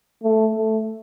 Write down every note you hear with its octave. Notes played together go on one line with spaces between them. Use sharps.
A3
A3